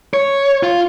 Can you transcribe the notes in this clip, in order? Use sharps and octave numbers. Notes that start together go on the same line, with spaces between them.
C#5
F4